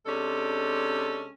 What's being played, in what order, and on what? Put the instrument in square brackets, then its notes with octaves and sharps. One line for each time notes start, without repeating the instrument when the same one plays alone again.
[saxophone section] C3 G#3 C#4 D4 A4